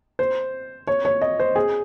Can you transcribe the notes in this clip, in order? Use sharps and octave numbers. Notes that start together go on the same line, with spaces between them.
C5
C#5
C#5
D#5
C5
G#4